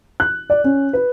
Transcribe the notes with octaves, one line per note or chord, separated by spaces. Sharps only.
F#6
D5
C#4
B4